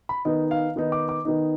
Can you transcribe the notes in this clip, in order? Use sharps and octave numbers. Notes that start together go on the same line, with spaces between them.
B5
D#3 B3 D#4 D#5
F5
D#3 B3 D#4
D6
D6
D#3 B3 D#4